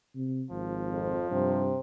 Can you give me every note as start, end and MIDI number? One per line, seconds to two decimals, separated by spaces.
0.15 0.44 48
0.51 1.19 32
0.51 1.68 53
0.92 1.27 41
1.31 1.73 43
1.31 1.80 48